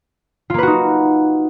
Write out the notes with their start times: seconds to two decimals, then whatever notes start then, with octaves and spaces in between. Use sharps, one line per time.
0.50 F4
0.54 A#3
0.58 B4
0.63 F#4
0.67 D#4